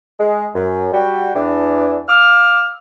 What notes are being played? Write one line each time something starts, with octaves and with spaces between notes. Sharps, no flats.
G#3
F#2
G3 F#4 G5
E2 E3 D4
F5 D6 E6 F6